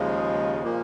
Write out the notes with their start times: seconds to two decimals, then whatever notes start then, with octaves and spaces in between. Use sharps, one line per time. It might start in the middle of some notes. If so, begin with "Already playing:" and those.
Already playing: D#2 C#3 F3 G#3
0.63 A#2 F3 A#3